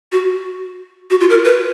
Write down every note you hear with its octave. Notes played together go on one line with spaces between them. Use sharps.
F#4
F#4
F4
A#4
B4